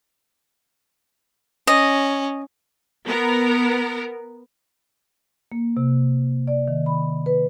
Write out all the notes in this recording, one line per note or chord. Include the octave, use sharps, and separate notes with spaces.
C#4 D#5
B3 A#4
A#3
C3
D5
D#3
B5
B4